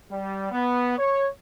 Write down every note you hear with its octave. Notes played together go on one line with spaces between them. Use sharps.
G3
B3
C#5